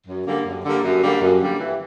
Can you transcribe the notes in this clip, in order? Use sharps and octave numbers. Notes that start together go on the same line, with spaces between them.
F#2
D3 G3 A#3
F#2
D3 G3 A#3
F#2
D3 G3 A#3
F#2
D3 G3 A#3
E3